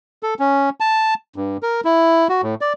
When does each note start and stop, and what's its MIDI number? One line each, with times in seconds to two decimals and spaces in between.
0.23 0.34 69
0.39 0.70 61
0.80 1.14 81
1.36 1.57 43
1.63 1.81 70
1.85 2.28 64
2.29 2.41 66
2.43 2.55 45
2.61 2.73 74